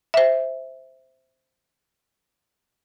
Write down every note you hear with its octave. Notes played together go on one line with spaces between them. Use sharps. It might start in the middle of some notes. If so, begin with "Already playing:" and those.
C5 E5